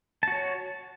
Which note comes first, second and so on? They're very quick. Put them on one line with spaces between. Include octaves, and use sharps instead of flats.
A5 F#4 C#5